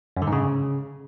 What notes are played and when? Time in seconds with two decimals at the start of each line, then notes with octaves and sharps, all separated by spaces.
0.17 F#2
0.22 D3
0.27 G#2
0.32 C#3